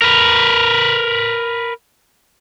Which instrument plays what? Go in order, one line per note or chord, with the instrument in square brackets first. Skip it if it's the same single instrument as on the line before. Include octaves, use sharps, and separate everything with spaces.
[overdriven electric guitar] A#4 B4